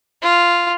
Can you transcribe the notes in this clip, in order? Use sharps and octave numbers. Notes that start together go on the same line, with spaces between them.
F4